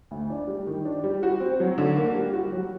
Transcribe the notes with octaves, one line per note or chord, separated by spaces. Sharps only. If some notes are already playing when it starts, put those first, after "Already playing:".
D2
D4
G3
D#3
D4
G3
F#4
C4
F#3
D3
A#3
G3
F#4
F#3